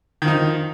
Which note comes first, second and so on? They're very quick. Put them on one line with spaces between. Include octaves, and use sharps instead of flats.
D#3 F3 D#4